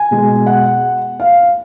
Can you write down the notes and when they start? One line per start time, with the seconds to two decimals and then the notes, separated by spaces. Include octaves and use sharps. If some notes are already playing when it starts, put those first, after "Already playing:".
Already playing: G#5
0.11 B2 G#3
0.46 F#5
1.20 F5